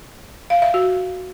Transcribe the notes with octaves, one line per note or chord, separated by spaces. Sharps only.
F5
E5
F#4